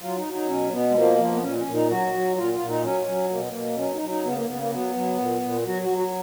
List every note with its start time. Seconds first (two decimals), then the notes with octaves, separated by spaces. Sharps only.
0.01 F#3 F4
0.16 D#4
0.25 F#3
0.33 D#4
0.48 B2 C#4
0.72 B2 B3
0.90 G#3
0.95 F3 A#3
1.18 F3
1.33 B3
1.42 A#2 C#4
1.58 C#4
1.66 A#2
1.73 D#4
1.89 F#3 F#4
2.13 F#3
2.36 A#2 F4
2.53 F4
2.59 A#2
2.68 D#4
2.83 F#3 C#4
3.06 F#3
3.30 B2 A#3
3.40 B3
3.50 B2 A#3
3.77 F#3 C#4
3.93 D#4
4.01 F#3
4.09 D#4
4.24 C#3 B3
4.36 A#3
4.48 C#3 B3
4.61 A#3
4.72 F#3 B3
4.95 F#3
5.18 A#2
5.42 A#2
5.65 F#3 F#4
5.82 F#4
5.89 F#3
5.98 F#4